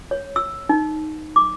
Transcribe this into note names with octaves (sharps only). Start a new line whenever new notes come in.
C#5
E6
D#4
D6